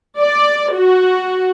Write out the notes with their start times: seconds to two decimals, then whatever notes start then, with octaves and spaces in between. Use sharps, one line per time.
0.19 D5
0.75 F#4